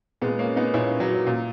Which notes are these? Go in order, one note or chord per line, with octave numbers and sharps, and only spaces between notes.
A#2 G#3 B3
A#3 C#4
B3 D#4
A#2 C#4 E4
F#3
A#2